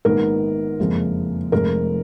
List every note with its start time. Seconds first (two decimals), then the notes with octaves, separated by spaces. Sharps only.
0.05 A#1 G#2 D#3 G#3 B3 A#4
0.79 F#1 F2 F3 G#3
1.52 F1 F2 F3 G#3 A#4